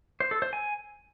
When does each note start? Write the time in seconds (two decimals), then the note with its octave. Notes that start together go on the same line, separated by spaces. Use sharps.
0.20 C5
0.31 A4
0.42 C5
0.53 G#5